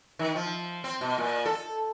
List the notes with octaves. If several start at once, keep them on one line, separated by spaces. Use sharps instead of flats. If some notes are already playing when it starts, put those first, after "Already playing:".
D#3
F3
C4
B2
A#2
A4